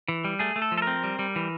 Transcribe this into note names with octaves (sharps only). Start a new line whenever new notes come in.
E3
G3
A3 G#4
A3
A4
F3
A4
A#4
C4
G3
G3
E3